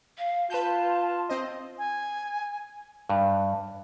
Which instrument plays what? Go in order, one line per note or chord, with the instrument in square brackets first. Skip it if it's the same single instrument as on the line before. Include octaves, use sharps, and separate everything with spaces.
[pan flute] F5
[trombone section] F4 [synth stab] B4 G6 [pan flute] A5
[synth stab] C4 C5 D#5
[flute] G#5
[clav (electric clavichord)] G2